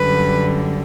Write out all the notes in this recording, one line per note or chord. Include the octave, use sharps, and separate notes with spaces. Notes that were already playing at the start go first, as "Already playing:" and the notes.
Already playing: F#2 D3 G3 B4